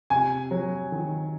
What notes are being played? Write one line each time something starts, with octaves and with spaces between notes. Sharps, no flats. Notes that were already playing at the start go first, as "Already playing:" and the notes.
C3 G#5
F#3
D#3